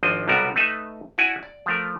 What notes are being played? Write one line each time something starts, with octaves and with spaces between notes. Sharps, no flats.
G#1 F3 C4 D4 D#5
B1 C3 G3 B3 F#4 A#4
A3 D#4 B4 E5
E4 F#4 D5 G#5
D5
F3 A3 A#4